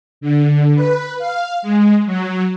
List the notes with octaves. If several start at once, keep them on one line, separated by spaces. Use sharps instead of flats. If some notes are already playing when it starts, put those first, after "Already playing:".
D3
B4
F5
G#3
F#3